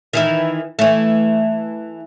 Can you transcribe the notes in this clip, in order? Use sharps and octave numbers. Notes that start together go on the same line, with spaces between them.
D#3 E3 E4
E3 A3